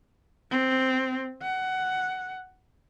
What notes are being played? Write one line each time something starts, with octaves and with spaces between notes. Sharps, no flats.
C4
F#5